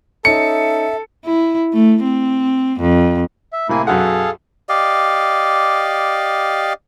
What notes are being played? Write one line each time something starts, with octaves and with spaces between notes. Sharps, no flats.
C#4 D#4 A4 E5 C#7
E4
A3
C4
F2
E5
A2 C3 A#3 E4 G#5
B1 F#2 G#4 A4 F5 F#5
G4 D5 D#5 F5